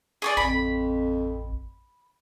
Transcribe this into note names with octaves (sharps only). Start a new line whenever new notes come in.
G#4 C#5 D5
A1 F2 B5